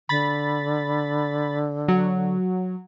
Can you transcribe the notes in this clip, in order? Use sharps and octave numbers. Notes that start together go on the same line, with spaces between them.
D3 B5 A6
F#3